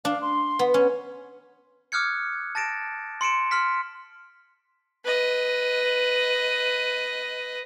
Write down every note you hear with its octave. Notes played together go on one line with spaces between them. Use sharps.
D4 F5
C6
B3
C#4
D6 D#6 F6 F#6 G#6 C#7
A5 A6 A#6 D7 E7
C6 C#7 D7 E7
C6 F6 B6
B4 D#5